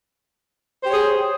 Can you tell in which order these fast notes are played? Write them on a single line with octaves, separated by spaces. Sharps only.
C5 G4 C#5 G#4